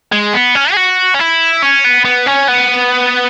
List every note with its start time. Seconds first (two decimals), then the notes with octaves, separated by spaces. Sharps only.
0.12 G#3
0.33 B3
0.55 C#4
0.72 G#4
0.77 F#4
1.14 C#4
1.19 E4
1.62 C#4
1.84 B3
2.05 B3
2.27 C#4
2.48 B3